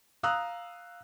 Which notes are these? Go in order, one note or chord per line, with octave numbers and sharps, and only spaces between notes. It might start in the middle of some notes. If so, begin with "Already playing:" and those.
F5 A#5 D#6 E6 F#6